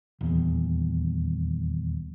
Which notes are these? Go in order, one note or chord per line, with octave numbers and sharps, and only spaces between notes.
D#1 E2